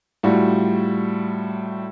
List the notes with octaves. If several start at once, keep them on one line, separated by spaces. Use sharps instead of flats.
A2 G3 F4 F#4